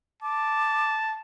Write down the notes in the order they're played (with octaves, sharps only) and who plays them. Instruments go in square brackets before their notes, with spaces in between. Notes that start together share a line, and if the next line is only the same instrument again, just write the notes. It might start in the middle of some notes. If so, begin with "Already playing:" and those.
[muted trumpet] A5 [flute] D6